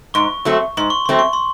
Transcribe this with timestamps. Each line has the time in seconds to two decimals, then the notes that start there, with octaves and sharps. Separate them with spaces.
0.14 G#2 C#6
0.45 F#3 A3 C4
0.77 G#2 C6
0.90 C#6
1.06 F#3 A3 C4 C6
1.19 C#6
1.33 C6